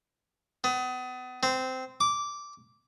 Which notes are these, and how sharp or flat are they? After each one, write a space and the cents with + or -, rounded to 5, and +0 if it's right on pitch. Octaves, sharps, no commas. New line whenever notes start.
B3 +35
C4 -15
D6 -10